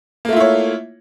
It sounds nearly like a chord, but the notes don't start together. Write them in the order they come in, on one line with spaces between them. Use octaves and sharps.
A#3 A3 F4 E4 C#5